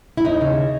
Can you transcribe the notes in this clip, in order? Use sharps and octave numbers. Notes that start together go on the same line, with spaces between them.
E4
D#2 D#4
C#3